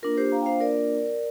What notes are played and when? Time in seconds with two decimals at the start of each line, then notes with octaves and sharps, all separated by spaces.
0.02 A#3 D4 F4 A#4
0.17 G4 C5
0.32 F5 A#5
0.42 G5
0.46 C5 F5
0.60 A#4 D5